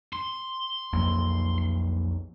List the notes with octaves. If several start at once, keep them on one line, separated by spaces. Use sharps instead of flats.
C6
B1 F2 A#3